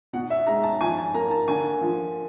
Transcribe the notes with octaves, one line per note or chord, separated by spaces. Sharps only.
B2 F#5
E5
G#3 A#5
A5
F3 G#5
A5
A#3 A#5
A5
D3 G#5
F3